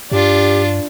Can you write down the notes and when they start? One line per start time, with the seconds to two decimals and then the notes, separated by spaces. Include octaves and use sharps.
0.12 G2 D4 F4 G4